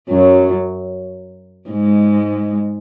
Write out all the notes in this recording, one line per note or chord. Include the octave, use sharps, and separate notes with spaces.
F#2 F#3
G#2 G#3